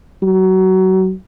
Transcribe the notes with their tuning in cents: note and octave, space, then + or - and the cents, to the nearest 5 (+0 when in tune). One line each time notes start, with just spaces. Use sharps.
F#3 +25